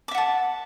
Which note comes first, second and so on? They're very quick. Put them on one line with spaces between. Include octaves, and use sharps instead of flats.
D6 E5 F#5 A5